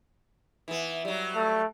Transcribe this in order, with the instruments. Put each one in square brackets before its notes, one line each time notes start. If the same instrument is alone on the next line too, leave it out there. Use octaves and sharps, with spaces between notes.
[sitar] E3 B3
F#3 G3
[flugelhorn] A3